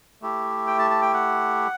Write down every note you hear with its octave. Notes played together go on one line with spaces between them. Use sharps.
A3 E4 G4
G5
A5
A5
G5
F#5